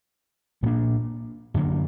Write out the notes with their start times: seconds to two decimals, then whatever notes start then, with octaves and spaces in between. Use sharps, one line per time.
0.63 A#2 G3 A#3 D4
1.54 F#2 D3 F#3 A#3